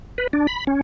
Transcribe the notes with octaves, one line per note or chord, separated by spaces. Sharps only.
B4
D4
B5
C#4